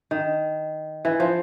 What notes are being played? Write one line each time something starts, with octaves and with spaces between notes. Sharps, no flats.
D#3
E3
F3